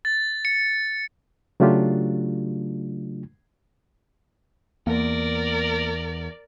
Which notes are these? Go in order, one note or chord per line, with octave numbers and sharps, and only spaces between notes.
A6
C#7
C#3 F#3 A3 D4 F4 G4
E2 A#3 A#4 D5